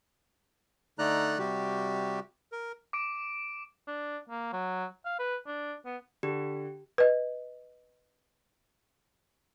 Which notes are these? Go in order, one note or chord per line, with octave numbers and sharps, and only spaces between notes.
D3 A3 D#4 D5 A#5 F#6
C3 G3 F#4 G4
A#4
D6 D7
D4
A#3
F#3
F5
B4
D4
B3
D3 G4
B4 D#5